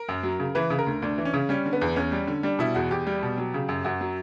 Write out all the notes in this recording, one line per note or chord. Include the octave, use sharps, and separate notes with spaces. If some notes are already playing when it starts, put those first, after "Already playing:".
Already playing: A#4
F#2
F#3
C#3
E3 B4
C#3
A#4
D2
D2 D4
E3
C#4
C#3
G3 C#4
D3
B3
E2
E2 C#4
G3
D3
G3 D4
B2 E4
E2 F#4
E2 G4
G3
B2
F#3
C#3
F#2
F#2 F#4
F#3